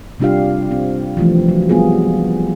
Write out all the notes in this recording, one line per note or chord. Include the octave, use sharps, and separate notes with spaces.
C3 G3 D4 F4 G4 F5
C4
E3 F3 A3
F#3
G3 B3 F4 G#4